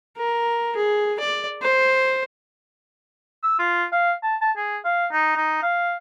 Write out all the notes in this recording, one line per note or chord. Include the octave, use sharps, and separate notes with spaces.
A#4
G#4
D5
C5
E6
F4
F5
A5
A5
G#4
F5
D#4
D#4
F5